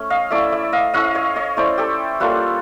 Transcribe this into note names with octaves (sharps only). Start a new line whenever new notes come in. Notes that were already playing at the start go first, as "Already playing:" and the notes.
Already playing: A3 C#4
D#5 F5
A3 C#4 E4 D5 E5
D5 E5
D#5 F5
A3 C#4 E4 D#5 F5
C#5 D#5
C#5 D#5
A3 C#4 E4 C5 D5
G4 A4
G3 A#3 C#4 F4 A4 B4